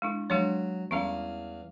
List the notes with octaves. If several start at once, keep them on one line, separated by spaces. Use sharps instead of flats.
G#3 D4 E4
F#3 G#3 D4 C#5
E2 G3 C#4 E4 F5